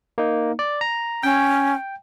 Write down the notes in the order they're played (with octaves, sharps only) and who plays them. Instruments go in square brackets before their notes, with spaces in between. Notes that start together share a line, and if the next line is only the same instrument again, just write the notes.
[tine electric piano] A#3 D#4
D5
A#5
[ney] C#4 [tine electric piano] G5